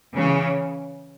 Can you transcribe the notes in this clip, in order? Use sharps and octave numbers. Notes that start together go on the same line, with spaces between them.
C#3 E3